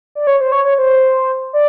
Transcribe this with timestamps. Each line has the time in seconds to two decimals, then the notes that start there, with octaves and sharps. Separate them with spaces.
0.15 D5
0.27 C#5
0.41 C5
0.52 C#5
0.65 C#5
0.78 C5
1.53 D5